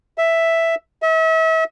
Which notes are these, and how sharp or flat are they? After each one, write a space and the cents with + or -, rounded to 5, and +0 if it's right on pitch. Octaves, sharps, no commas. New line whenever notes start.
E5 +0
E5 -40